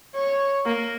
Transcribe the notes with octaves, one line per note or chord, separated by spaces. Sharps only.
C#5
A#3